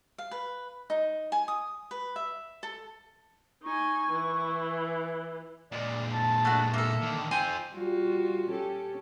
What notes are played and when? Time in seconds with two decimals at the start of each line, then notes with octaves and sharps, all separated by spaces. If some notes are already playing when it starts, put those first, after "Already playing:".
0.18 F5
0.31 B4
0.90 D#4
1.32 G#5
1.48 D#6
1.91 B4
2.16 E5
2.63 A4
3.64 D#4 G#5 C#6
4.11 E3
5.72 A#2 G#3 D5
6.13 A5
6.45 A3 D4 F#4
6.74 A#3 A4 E5
7.02 D3 D#3
7.31 C4 F4 G5 G#5 C6
7.73 G3 F4 F#4
8.50 C#4 G4 A4